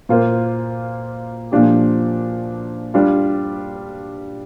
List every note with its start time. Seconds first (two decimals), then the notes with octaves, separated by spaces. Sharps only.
0.09 A#2 A#3 F4 C5
1.52 A#2 F3 D4 G4
2.94 G3 D4 F4